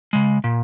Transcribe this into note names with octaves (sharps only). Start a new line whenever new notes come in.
C#3 G#3
A#2